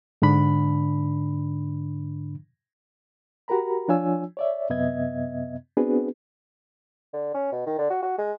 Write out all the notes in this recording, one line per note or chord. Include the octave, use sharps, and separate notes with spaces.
G#2 D3 D4 B5
F#4 G4 A#4 A#5 B5
F3 D4 F4 C#5 G#5 E6
C#5 D5 E5
F#2 C3 B3 D#5 E5 G#6
B3 C4 D4 F#4 G#4 B4
D3
C#4
B2
D#3
D3
F#4
F#4
G#3